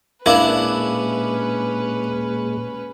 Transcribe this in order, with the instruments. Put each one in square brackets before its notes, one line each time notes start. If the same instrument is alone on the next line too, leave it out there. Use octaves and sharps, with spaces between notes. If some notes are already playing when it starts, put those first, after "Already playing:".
[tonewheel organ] A#2 G#3 [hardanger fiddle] C#4 B4 [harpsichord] D4 E4 [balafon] A#4 F5